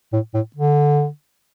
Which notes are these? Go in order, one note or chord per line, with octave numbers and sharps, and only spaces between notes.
A2
A2
D3